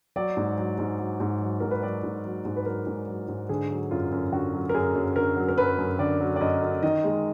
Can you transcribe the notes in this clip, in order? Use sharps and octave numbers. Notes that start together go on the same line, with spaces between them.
F#3 D5
G#2
F#3
G#2
F#3
G#2
F#3
G#2 A#4
B4
F#3 D5
G#2
F#3
G#2
B4
F#3 A#4
G#2
F#3
G#2
D3 G#4
F#3
F#2 F4
F#2
D3 F#4
F#3
A#4
F#2 G#4
F#2
D3 A#4
F#3
A#4
F#2 B4
F#2
D3 D5
F#3
D5
F#2 D#5
F#2
D#3 D#5
G#3